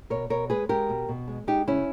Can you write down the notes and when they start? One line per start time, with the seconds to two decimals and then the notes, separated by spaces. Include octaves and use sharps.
0.10 B2 A#4 C#5
0.30 B2 A#4 C#5
0.50 G#3 G#4 B4
0.69 G#3 G4 A#4
0.89 B2
1.09 B2
1.28 G#3
1.47 G#3 D#4 G4
1.67 C#3 C#4 E4